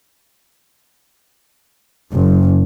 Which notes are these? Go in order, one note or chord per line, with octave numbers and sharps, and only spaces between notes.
F#1